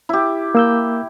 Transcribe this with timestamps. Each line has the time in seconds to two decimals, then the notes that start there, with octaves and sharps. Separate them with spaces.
0.09 E4 G4
0.55 A#3 E6 G6